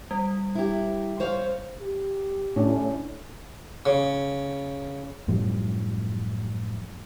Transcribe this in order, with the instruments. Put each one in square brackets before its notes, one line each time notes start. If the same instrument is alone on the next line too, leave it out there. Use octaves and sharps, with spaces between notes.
[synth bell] G3
[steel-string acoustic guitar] E4 G4
C5 C#5 F5
[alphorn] G4
[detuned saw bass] A2 [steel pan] C#4 D4
[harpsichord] C#3
[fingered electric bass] F#2 A2 F3 G3